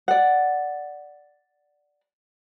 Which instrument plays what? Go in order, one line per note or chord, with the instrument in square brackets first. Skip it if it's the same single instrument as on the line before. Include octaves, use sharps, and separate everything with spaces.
[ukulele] D5 F#5